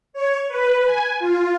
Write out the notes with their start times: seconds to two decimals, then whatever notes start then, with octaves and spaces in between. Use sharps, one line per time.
0.13 C#5
0.48 B4
0.85 G#5
1.19 F4